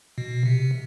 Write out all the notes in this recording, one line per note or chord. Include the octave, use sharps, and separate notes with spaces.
B2
C3